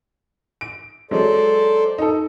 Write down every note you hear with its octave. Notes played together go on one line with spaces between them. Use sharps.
D7
F#3 G#3 A4 C5 D5
D#4 A4